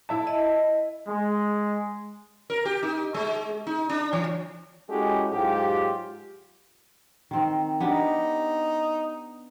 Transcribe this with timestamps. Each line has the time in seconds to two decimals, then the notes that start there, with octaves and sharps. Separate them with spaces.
0.09 E4 E5 A5
0.27 D#5
1.08 G#3
2.50 A#4
2.65 G4
2.83 D#4
3.14 G#3
3.67 D#4
3.90 D4
4.13 E3
4.89 G#3 C#4 E4 F#4 G4 A4
5.32 G#2 F#3 F4 G4
7.31 D#3 C4
7.80 B3 D4 D#4 G4